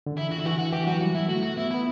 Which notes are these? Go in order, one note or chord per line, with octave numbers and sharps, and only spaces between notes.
D3
E3 E4
F#4
D3 E4
E3 F#4
F#4
E3 G4
F#3 F#4
G3 F#4
E4
A3 F#4
F#4
B3 E4
B3 E4